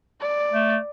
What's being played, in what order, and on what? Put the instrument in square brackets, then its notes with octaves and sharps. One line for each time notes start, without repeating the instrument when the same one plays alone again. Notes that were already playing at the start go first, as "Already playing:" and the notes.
[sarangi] D5
[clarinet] A3